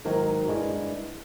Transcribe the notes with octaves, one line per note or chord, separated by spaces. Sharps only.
G#2 D#3 F#3
G2 E3 G#3